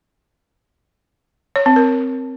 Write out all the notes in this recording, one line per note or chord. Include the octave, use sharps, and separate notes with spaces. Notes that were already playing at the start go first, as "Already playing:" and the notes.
C#5
C4
A#4